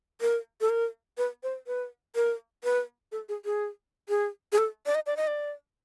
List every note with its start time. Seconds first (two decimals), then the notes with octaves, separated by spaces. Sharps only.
0.21 A#4
0.61 A4
0.70 A#4
1.18 B4
1.43 C5
1.67 B4
2.15 A#4
2.64 B4
3.12 A4
3.29 G#4
3.45 G#4
4.09 G#4
4.52 G#4
4.58 A4
4.86 D5
4.95 D#5
5.07 D5
5.17 D#5
5.27 D5